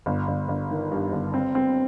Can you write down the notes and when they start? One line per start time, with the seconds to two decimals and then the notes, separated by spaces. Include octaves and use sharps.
0.06 G1
0.28 G1
0.48 G1
0.71 D#3
0.92 G2
1.12 G1
1.34 C4
1.55 C4